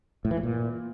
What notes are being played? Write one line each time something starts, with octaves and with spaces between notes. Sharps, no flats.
A2
E3
A2
A#2